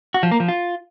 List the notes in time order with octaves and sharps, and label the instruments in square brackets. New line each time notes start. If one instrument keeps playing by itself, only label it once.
[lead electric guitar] F#4
F3
A#3
F3
F4